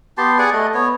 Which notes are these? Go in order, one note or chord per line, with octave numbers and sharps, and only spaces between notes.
B3 G4 A5 C6
G#4 D5 F#5 G#5
A3 D#5
B3 C#5